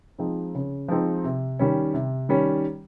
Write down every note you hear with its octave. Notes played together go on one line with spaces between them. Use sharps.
F3 G#3 C4 D#4
C#3
F3 G#3 C4 D#4
C3
D#3 G3 C#4
C3
D#3 G3 C#4